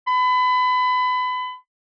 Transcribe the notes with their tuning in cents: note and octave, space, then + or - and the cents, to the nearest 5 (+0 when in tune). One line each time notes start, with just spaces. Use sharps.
B5 +30